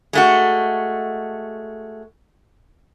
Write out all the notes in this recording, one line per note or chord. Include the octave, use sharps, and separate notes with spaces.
G#3 A3 F#4